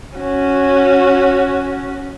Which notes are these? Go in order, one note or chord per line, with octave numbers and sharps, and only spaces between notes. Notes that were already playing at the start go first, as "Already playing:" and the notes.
C#4 F#4